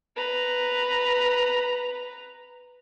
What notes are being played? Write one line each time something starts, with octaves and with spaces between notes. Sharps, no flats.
B4 A#5